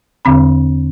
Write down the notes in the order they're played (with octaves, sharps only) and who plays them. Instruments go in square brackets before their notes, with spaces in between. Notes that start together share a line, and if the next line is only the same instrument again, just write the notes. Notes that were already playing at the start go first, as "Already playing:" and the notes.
[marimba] E2 D3 C4 B5